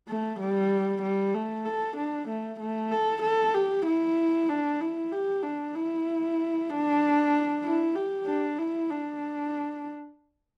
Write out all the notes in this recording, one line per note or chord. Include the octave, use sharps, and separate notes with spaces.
A3
G3
G3
A3
A4
D4
A3
A3
A4
A4
G4
E4
D4
E4
G4
D4
E4
D4
E4
G4
D4
E4
D4